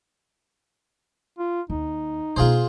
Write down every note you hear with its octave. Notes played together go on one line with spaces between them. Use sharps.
F4
D#2 D#4
B2 B3 F4 G#4 C5